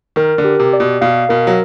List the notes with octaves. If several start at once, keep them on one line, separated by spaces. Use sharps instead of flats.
D#3 A#4
D3
G4
C3
D5
B2
B2 F5
B2 A#4
F#3